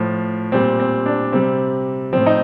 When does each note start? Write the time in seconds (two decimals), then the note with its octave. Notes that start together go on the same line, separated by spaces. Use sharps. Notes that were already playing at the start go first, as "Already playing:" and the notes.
Already playing: A2 F3
0.52 A#2 G3 C4
0.80 C4
1.06 D4
1.33 C3 G3 C4
2.13 A2 F3 C4
2.26 D#4